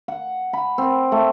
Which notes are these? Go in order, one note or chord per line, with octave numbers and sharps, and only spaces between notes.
F#5
B5
C4
A3